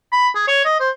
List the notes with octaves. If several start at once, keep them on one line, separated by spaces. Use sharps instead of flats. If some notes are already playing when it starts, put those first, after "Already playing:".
B5
G#4
C#5
D#5
C5